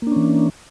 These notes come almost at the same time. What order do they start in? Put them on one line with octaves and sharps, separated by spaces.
A#3 D4 C#4 E3